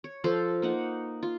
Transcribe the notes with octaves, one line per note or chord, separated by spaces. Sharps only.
C#5
F3 A4 C5 F5
A#3 D#4 F#5
F4